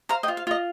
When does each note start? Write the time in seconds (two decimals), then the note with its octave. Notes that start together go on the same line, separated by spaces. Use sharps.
0.09 C5 F5 A#5
0.23 D#5 G5
0.28 F4
0.37 F5
0.47 F4 D#5